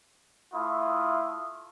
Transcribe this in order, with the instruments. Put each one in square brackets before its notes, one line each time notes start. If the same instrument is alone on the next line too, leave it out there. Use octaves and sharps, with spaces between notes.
[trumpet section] A3 E4 F4 D#6